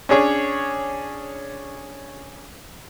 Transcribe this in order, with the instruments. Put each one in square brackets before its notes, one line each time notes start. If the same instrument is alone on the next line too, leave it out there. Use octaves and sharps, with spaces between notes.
[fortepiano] C#4 D4 G#4 C#5